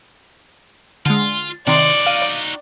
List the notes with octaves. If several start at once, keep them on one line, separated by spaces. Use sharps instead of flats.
D3 G#3 F4
C3 D#3 D#4 F#4 D5 C6
F5 D#7